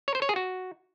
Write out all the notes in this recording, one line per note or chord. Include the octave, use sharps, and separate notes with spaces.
C#5
C5
C#5
G#4
F#4